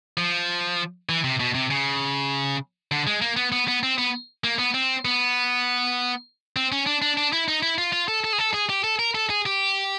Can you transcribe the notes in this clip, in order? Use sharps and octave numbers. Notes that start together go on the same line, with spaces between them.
F3
E3
C3
B2
C3
C#3
D3
G#3
A#3
B3
B3
B3
C4
B3
A#3
B3
C4
B3
C4
C#4
D4
D4
D4
E4
D#4
E4
F4
F4
A4
A4
G#4
A4
G#4
G4
A4
A#4
A4
G#4
G4